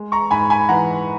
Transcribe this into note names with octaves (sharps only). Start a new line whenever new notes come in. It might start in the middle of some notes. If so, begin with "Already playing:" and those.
Already playing: G#3
A#5 C#6
G#2 G#5 B5
G#5 B5
E3 F#5 A#5